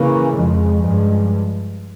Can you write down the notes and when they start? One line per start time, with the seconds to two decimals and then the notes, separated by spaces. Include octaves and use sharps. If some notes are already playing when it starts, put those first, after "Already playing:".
Already playing: C#3 E3 A#3 C#4
0.36 F2 C#3 F3 G#3
0.83 G2 F3 G#3